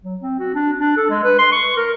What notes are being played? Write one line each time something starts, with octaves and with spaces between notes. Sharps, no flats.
F#3
C4
F#4
D4
D4
A4
G#3
B4
C6
C#6
A#4